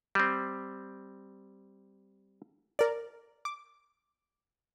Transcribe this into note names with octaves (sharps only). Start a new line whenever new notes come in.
G3 C4
A#4 D5
D6